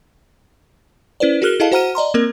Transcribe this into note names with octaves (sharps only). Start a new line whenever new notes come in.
C#4 E4 B4 C5 D5
F#4 G#4 A#4 F6 F#6 G7
E4 G#4 A4 D#5 F5 A5
F#4 C5 F#5 A#5 F6 D#7
D5 D#5 A#5 C6
A#3 C4 A#4